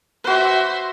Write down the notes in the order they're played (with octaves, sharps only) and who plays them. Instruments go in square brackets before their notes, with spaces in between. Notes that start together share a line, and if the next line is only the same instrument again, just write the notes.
[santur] F#4 B4 [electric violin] C5 E5